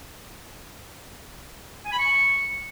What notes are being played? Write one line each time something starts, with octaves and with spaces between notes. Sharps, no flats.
G#5
B5
C#6